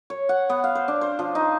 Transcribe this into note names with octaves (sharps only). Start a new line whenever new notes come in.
C#5
F#5
B3
F5
C5
D4
C5
F3
D#4